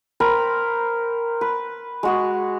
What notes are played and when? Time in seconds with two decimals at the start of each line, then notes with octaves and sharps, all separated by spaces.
0.20 A#4 C5 G5 B5
1.41 B4
2.03 G#3 F#4 G#4